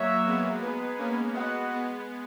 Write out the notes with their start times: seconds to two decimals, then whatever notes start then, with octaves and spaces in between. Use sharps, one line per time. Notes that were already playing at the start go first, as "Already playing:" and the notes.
Already playing: F#3 A#3 F#4 C#5 E5
0.27 G#3 B3
0.62 G#3 B3 D#4 G#4 B4
0.98 A#3 C#4
1.34 G#3 B3 F#4 B4 D#5 F#5
1.70 G#3 B3